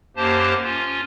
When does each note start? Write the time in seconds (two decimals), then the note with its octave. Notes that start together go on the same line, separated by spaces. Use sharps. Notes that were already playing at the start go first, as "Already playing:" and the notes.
0.16 F#2 A#3 G4 C5 A5
0.64 C#4 F4